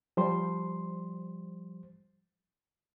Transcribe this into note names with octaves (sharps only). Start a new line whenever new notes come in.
F3 G3 C5 C6